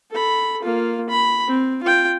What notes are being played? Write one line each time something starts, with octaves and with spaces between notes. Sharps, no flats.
A4 B5
A#3 F4
B5
C4
F4 G5